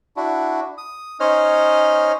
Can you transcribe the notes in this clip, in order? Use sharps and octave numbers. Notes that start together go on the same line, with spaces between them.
D4 E4 F#4
D#6
C#4 D#4 C5 C#5 D#5 F6